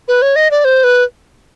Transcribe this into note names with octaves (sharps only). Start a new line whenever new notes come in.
B4
C#5
D#5
D5
C5
B4